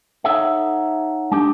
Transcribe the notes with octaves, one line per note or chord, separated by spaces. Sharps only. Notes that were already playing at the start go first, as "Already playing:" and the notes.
D#4 A4 C#5 E5 F#5
G#3 D4 G4